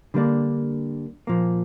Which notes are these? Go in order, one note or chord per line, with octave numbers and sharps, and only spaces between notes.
D3 G3 A#3 D4
A#2 F3 A#3